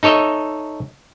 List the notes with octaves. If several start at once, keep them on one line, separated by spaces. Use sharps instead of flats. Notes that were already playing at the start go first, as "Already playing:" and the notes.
D#4 A4 C#5 D#5 E5